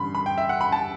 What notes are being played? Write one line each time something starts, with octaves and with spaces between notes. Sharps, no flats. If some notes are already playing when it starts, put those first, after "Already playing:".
Already playing: A1 G2 D3 B5 C6
B5
G5
E5
F#5
B5
A5